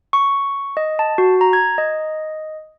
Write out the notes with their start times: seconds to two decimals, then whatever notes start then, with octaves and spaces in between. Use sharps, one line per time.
0.13 C#6
0.77 D#5
0.99 A5
1.18 F#4
1.41 A#5
1.53 G#6
1.78 D#5